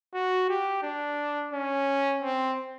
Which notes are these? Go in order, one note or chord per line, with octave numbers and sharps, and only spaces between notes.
F#4
G4
D4
C#4
C4